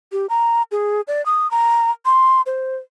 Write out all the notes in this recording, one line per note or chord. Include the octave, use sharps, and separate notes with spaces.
G4
A#5
G#4
D5
D#6
A#5
C6
C5